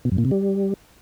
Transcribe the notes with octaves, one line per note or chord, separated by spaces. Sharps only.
B2
F#2
A#2
C3
G3